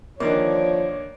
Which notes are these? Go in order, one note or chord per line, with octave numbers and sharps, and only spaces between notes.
D3 D#3 F3 A#3 C#5 D5